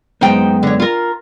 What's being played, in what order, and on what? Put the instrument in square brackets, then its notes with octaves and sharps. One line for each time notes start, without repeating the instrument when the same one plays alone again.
[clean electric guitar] F#2 G#3 B3 [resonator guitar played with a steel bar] D#4 C5 G5
[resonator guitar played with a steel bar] D3 C#5
F4 A#4